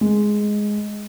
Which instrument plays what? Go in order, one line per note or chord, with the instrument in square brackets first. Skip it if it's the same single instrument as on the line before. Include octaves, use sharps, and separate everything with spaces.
[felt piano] G#3